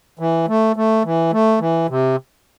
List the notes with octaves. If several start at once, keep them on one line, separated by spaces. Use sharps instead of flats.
E3
A3
A3
E3
A3
E3
C3